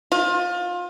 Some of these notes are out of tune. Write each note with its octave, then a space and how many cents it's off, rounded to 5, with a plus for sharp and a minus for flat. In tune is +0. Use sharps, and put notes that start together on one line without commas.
F4 +25